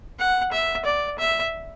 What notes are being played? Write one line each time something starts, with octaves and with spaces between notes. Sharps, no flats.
F#5
E5
D5
E5